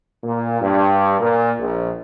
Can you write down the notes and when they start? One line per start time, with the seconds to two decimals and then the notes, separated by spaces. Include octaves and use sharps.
0.24 A#2
0.62 G2
1.20 A#2
1.59 A#1